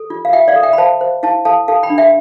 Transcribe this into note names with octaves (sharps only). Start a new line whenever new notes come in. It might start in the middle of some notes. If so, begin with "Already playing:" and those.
Already playing: A4
F4
F5
F4 E5 G5
D5 F5
A4
E5 G5
B5
C5 F5 A5
C5
E4 F5 A5
A4 F5 A5
A4 F5 A5
G5 B5
D4
E5 G5